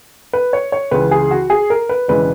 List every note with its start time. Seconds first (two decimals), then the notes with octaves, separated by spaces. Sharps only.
0.33 B4
0.53 C#5
0.72 C#5
0.91 C#2 C#3 E3 B4
1.11 G#4
1.31 F#4
1.50 G#4
1.70 A#4
1.89 B4
2.08 E1 C#3 E3 G#3 B4